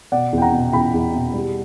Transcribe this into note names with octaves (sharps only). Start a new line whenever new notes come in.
B2 D5 F#5
E2
G5
F#5 A#5
B2
E2 G5 B5
E2
B2
G3